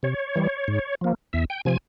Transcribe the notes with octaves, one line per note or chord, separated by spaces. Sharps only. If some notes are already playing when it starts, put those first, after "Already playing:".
C3 C#5
E3 G3
G#2
F3 A#3
E2 E5
G5
C3 F3 G#5